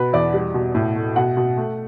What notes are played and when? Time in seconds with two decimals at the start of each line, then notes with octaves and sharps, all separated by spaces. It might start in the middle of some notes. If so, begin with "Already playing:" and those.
Already playing: B2 B4
0.13 E2 D5
0.34 G3
0.54 B2
0.75 A2
0.96 A3
1.16 B2 F#5
1.37 B2
1.57 A3